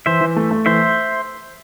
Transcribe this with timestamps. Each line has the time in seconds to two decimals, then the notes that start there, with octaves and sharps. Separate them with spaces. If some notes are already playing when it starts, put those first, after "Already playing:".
0.06 E3 C5 E5
0.21 E3
0.36 A3
0.51 A3
0.66 E3 C5 E5